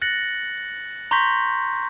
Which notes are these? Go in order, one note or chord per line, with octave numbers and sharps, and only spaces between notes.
F#6 A6 A#6 C#7 F#7
A#5 C6 C#6 G6 A#6 B6